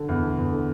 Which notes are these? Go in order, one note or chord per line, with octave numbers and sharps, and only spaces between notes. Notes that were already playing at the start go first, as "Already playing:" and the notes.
Already playing: D3
E2
D3
E2
D3